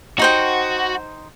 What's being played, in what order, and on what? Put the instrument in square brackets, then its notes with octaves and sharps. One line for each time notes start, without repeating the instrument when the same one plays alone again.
[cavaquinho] D#4 C5 G5 [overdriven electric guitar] F#4